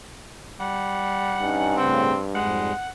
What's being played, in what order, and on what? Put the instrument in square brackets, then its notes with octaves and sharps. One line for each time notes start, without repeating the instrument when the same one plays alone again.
[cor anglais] G3 [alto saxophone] F#5
[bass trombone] G2 [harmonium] C#4 D#4
[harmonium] A2 C#3 G5 [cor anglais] C4
[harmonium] F2 G#2 G3 [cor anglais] G#3 [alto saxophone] F#5